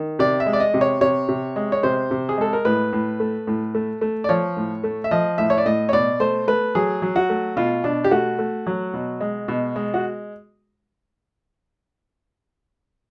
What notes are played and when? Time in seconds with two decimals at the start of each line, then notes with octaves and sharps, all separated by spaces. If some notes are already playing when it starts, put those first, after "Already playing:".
Already playing: D#3
0.19 C3 D5
0.40 E5
0.46 G#3
0.53 D5
0.60 D#5
0.74 C3
0.81 C#5
1.01 C3 C#5
1.29 C3
1.56 G#3
1.72 C#5
1.83 C3 C5
2.11 C3
2.29 G#4
2.38 G#3 A4
2.53 A#4
2.65 A2 B4
2.93 A2
3.20 A3
3.47 A2
3.75 A3
4.01 A3
4.24 D5
4.29 F3 C#5
4.57 A2
4.84 A3
5.04 E5
5.11 F3 D#5
5.38 A2 E5
5.50 C#5
5.58 D5
5.66 A2 D#5
5.89 C#5
5.93 B2 D5
6.20 A3 C5
6.47 A3 B4
6.75 F#3 G#4
7.02 F#3
7.16 F#4
7.30 A3
7.56 B2 F4
7.84 B2 D4
8.04 G4
8.11 A3 F#4
8.39 A3
8.67 F#3
8.93 B2
9.21 G#3
9.48 B2
9.76 G#3
9.94 F#4